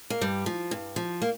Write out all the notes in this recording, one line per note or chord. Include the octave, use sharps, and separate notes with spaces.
A#3
G2 G3
F3
G2
F3
A#3